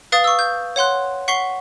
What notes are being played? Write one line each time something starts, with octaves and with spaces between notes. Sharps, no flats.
B4 F5 D#6 A6
C#6 E6
G6
C#5 F#5 C6 F#6
F#5 C#6 B6 C7 G7